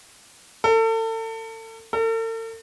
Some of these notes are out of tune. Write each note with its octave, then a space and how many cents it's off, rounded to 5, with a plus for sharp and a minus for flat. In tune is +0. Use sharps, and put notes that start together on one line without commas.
A4 +35
A4 +45